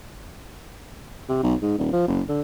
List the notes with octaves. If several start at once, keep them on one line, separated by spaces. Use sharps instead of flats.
C3
B1
G#2
D#1
F3
F#1
D3